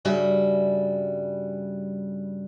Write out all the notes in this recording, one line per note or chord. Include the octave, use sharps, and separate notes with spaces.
G2 C#3 G3 F#4 E5